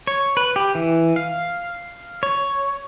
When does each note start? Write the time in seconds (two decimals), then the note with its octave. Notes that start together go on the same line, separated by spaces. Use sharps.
0.07 C#5
0.37 B4
0.56 G4
0.75 E3
1.16 F5
2.23 C#5